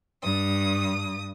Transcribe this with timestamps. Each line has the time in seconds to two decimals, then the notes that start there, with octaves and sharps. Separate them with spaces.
0.22 G2 D#6